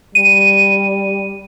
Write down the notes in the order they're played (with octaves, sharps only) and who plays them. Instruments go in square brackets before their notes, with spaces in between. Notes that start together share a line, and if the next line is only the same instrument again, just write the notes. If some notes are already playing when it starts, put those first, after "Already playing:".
[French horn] G3 [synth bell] D#7